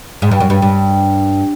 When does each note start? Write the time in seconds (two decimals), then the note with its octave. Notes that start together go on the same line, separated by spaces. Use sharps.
0.22 G#2
0.31 G2
0.40 F#2
0.50 G2
0.62 G2